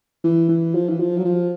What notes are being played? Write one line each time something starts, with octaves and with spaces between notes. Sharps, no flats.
E3
E3
F3
E3
F3
F#3
F3